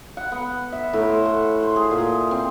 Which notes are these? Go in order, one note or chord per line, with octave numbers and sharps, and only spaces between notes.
F#5
B3
E5
A2
C5
F#5
C5
G#4
A#2
C4